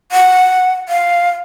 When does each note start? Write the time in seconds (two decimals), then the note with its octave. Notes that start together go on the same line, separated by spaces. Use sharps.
0.12 F#5
0.89 F5